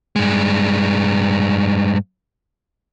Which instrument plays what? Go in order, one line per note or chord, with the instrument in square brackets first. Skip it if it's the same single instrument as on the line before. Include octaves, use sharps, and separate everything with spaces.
[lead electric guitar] G2 G#3